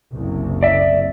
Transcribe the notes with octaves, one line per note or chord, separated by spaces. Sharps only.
F#1 C2
D5 E5